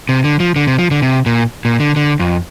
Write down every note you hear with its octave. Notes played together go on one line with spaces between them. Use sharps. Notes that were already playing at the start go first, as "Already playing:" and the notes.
C3
D3
F3
D3
C3
F3
D3
C3
A#2
A#2
D3
D3
F2